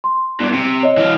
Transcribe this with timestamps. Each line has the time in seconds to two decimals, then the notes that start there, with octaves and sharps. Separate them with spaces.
0.04 C6
0.40 E2 G2
0.54 C3
0.83 C#5 D#5
0.97 E3 F5